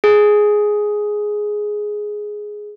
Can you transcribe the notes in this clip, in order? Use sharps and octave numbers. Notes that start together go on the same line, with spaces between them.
G#4